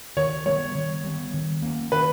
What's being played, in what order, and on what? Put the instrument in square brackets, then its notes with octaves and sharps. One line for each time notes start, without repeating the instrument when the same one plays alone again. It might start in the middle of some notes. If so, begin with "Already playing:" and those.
[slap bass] D#3 [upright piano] C#5
[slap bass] G3 B3 [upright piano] C#5
[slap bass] D#3
G3 B3
D#3
A#3 C#4
[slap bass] D#3 [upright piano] B4